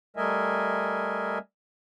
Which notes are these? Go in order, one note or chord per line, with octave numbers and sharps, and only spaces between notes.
G3 A3 A#4 D#5 E5 G#5